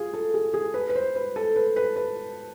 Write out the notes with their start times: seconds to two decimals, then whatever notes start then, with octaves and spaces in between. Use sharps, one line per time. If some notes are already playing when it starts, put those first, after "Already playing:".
Already playing: F4 G#4
0.14 A4
0.34 G#4
0.54 G#4
0.74 B4
0.89 B4
0.96 C5
1.16 B4
1.36 A4
1.56 B4
1.76 B4
1.96 B4